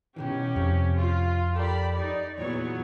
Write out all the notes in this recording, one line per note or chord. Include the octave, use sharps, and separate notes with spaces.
B2 D#3 E3 C#4 G4
F2 C3
F4
G4 A4 A#4 D5 B5
D#4 D5
E2 A#2 E3 F#3 B3 C#5